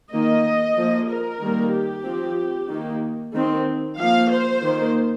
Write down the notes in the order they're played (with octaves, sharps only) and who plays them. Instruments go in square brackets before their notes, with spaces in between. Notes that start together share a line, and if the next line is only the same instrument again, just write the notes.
[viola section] D#3 A#3 D#5
F3 A#3
A#4
D#3 G3 A#3
G4
F3 C4
D#3 A#3
D#3 C4
F3 A#3 F5
C5
D#3 A#3